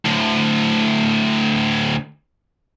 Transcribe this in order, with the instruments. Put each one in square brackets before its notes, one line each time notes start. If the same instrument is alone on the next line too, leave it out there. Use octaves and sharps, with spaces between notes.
[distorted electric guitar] D2 A2